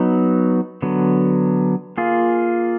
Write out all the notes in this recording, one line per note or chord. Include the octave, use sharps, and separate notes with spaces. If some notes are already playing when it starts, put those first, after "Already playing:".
Already playing: F#3 B3 D#4
D3 F#3 B3
A#3 F4 G#4